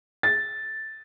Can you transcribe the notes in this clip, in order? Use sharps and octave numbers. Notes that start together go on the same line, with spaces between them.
A6